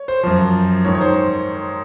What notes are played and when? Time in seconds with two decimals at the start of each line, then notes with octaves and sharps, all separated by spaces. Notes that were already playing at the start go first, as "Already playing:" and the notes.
Already playing: C#5
0.08 C5
0.23 F#2 F3
0.85 G#2 D#3 C#5
0.95 C#5
1.01 C5